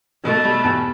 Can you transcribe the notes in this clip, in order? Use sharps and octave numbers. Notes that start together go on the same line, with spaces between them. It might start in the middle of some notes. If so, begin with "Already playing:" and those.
B2 A3
G3
E2